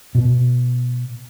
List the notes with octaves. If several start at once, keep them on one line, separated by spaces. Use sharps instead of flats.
B2